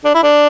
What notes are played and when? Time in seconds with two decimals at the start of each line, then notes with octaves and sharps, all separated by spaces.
0.05 D4
0.15 E4
0.24 D4